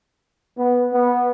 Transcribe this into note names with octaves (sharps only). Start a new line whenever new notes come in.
B3
B3